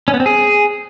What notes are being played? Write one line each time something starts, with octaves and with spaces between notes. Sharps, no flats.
C#4
B3
C4
G#4